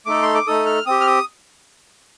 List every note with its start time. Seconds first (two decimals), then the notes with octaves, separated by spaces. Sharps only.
0.06 A3 D#4 A4 D6
0.22 C6
0.35 D6
0.47 A3 D#4 A4 D#6
0.66 F6
0.86 C4 G4 D#6
1.01 F6
1.07 D#6